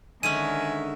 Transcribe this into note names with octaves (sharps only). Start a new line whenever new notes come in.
D3 D#3 G#3 C#4 E5 G#5 D#7